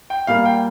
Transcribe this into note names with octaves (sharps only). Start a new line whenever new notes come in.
G5
A#2 G3 A#3 F5
G5